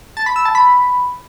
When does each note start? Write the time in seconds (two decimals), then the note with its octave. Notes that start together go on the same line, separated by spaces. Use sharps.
0.17 A5
0.26 B5
0.36 E6
0.45 A5
0.55 B5